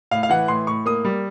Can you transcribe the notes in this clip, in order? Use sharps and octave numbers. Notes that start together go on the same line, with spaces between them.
A2 F5
F5
E3 F#5
A2 C6
A2 C#6
A#3 D#6
G3